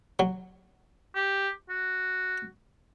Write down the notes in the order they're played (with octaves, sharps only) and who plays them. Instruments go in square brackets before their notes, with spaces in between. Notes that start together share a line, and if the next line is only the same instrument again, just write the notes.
[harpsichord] F#3
[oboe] G4
F#4